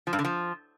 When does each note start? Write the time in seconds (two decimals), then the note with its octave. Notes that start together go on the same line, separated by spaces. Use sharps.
0.07 F3
0.13 G2
0.19 D3
0.25 F3